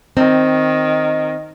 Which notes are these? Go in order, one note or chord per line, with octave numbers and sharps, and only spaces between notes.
D#3 C4